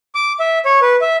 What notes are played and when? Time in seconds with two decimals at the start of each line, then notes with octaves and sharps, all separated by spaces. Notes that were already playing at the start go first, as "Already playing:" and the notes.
0.15 D6
0.40 E5
0.65 C#5
0.82 B4
1.01 E5